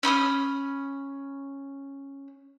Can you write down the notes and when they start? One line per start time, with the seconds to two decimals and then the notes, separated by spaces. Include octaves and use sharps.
0.03 C#4 B5 D#6 F6